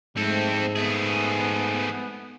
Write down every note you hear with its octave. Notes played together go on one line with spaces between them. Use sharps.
G#2 A3 C4 A4
A3 B3 G#4